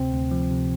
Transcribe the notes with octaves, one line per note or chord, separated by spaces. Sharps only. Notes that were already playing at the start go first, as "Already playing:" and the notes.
Already playing: D2 C3 C4
D2
F3
C3